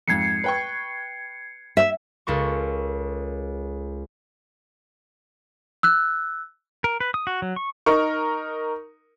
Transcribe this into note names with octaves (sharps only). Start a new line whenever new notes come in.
F2 G#2 G#6 C7 C#7
B4 G5 C#6
E5
C#2 A4 A#4 C#6
E6 F#6
A#4
B4
D#6
F#4
F#3
C#6
D#4 A#4 C#6